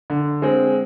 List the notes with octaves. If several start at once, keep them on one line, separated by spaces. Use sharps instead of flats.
D3
G#3 C4